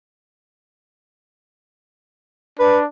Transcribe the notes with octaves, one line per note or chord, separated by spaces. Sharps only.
D4 B4